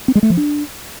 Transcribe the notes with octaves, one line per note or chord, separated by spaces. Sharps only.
C4
G#3
A3
F3
D4